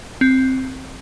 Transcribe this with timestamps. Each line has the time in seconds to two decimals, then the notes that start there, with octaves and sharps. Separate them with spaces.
0.21 C4